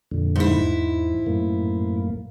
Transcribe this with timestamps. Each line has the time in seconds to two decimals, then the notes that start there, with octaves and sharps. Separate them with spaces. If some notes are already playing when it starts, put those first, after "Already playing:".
0.11 F2 A#2 D3
0.36 G#2 E4
0.61 E2
1.26 F#2 A2 A#3